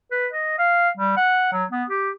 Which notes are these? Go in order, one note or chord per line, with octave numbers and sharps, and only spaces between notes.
B4
D#5
F5
G3
F#5
F#3
B3
G4